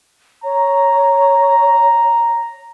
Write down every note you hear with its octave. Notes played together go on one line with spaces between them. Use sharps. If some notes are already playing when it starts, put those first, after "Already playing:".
C#5 A#5